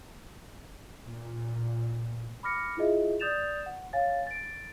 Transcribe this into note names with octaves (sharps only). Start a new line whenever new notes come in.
A#2
B5 D6 F6 A#6 C#7
E4 F4 G#4 D#5 E5
D5 D#6 G6 A6 E7 F7
F#5
C#5 F5 G#5 A6
A6 D7